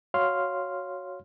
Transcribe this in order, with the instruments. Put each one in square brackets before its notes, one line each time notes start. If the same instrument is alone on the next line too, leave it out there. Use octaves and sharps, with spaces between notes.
[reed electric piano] F#4 C#5 F5 C6 F6